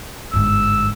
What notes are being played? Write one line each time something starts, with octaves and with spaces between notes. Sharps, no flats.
G1 G#2 E6